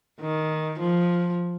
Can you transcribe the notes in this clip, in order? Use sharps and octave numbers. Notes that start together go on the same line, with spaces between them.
D#3
F3